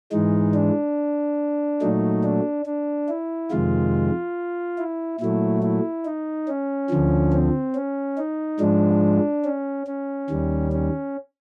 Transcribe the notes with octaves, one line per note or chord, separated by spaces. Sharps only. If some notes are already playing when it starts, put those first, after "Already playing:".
G#2 E3 G#3 D#4
D4
A#2 F#3 A3 D#4
D4
D4
E4
F2 C3 D#3 G#3 F4
E4
A#2 F#3 A3 E4
E4
D#4
C#4
D2 D3 F3
C4
C#4
D#4
G#2 F3 G#3 D4
C#4
C#4
D#2 D#3 G3
C#4